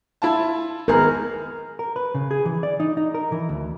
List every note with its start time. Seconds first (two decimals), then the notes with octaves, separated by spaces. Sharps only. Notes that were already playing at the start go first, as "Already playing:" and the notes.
0.22 E4 F4 A5
0.88 G#1 B3 G#4 A#4
1.79 A#4
1.96 B4
2.14 C#3
2.31 G#4
2.45 E3
2.63 D5
2.80 D#4
2.97 D#4
3.14 A#4
3.32 E3
3.49 D2